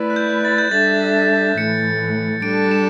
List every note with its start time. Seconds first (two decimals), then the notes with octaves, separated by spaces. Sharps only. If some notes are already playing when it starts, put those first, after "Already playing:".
Already playing: A3 E4 B4 D5
0.10 F#6
0.16 G6
0.45 A6
0.58 G6
0.71 G3 D4 A4 E5 A6
1.58 A2 E3 A3 C#7
2.42 G3 D4 A4 D7
2.71 E7